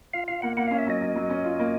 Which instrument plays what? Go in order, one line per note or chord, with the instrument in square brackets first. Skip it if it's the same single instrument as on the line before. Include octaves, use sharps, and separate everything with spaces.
[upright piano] F4 [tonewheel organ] F5
[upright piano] F4 [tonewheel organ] F5
[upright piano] A#3 [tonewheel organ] F#5
[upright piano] A#3 [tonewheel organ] F#5
[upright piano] C#4 [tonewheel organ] F5
[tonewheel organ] E5
[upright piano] F#3 [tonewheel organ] D#5
[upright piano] F#3
F#3
C#4
F4
A#3